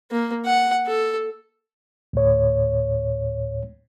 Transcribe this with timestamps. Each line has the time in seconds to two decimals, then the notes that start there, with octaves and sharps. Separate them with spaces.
0.11 A#3
0.45 F#5
0.87 A4
2.13 D2 A2 C#5